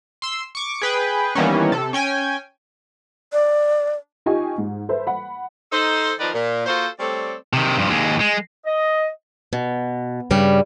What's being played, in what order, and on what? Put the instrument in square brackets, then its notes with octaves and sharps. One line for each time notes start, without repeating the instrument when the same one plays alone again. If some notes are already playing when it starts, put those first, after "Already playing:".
[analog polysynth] C6 E6
C#6 D6
G#4 B4 G5
D#3 E3 G3 A#3 B3 C#4
C3 A4
C#4 G5 G#5
[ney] D5
[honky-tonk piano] D#4 F4 G4 D#5 G#5 C#6
G#2
A4 B4 C5 E5
F#5 B5
[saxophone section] D#4 A4 C5
D#3 F3 D#4 A#4 B4 D5
A#2
A#3 F4 F#4 A4 C5
G3 A3 C4 A4 C#5 D5
[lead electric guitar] C3 D#3
G2 F3
D#2 G#3
G#3
[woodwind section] D#5
[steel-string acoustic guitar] B2
G2 C#3 G3